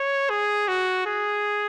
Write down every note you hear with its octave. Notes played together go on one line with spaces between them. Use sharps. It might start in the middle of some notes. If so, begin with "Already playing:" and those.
Already playing: C#5
G#4
F#4
G#4